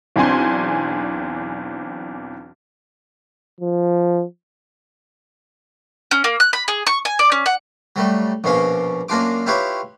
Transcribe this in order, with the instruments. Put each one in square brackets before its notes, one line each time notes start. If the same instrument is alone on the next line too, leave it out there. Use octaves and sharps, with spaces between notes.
[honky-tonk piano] B1 E2 C4 D4 G#5 C6
[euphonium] F3
[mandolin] C#4
A#3
F#6
B5
G#4
C#6
G#5
D5
C#4
F#5
[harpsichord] F#3 G3 A3
A#1 B2 C#4 F5 D6
F#2 A#3 D4 F4 D6
E4 F4 G4 B4 C#5